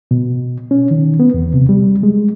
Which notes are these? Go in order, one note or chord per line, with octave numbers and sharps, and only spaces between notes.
B2
C#4
D#3
B3
E2
C3
G3
G#3